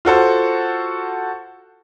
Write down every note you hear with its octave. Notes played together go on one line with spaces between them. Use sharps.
F4 F#4 A4 C5